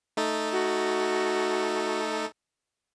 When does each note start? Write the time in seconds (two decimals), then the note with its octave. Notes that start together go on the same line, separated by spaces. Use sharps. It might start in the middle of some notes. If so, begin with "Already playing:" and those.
0.17 A3 D#4 A4
0.52 F#4